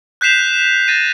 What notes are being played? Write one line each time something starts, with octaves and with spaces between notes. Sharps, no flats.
F#6 G6 B6 C7 E7 F7
A6 A#6 D#7